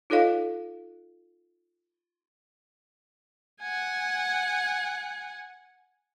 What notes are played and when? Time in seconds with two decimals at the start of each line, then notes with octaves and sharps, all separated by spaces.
0.10 D#4 F4 A4 C#5 D#5 F5
3.61 F#5 G#5